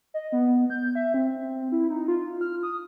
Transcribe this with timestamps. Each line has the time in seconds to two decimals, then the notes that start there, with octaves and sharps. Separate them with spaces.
0.14 D#5
0.32 B3
0.70 G6
0.95 E5
1.14 C4
1.72 E4
1.90 D#4
2.08 F4
2.41 F6
2.63 D#6